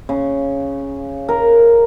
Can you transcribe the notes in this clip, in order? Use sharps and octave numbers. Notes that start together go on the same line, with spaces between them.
C#3
A#4